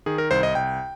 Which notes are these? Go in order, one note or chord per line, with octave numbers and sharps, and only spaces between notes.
D#3 G#4
A#4
C2 C5
D#5
C2 G5